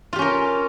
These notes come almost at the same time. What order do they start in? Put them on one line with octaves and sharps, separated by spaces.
F4 G4 C#4 A#4